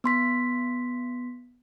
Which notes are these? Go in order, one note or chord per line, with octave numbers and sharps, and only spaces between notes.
B3 C6 B6